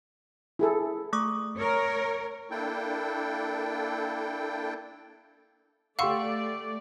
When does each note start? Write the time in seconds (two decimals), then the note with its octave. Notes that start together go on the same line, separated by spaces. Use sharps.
0.59 E4 G#4 A4
1.13 A3 C#6 D#6
1.58 A#4 C#5
2.51 A#3 D4 E4 A4 G5
5.99 A3 G4 D5 F5 F#5 C6 C#6 E6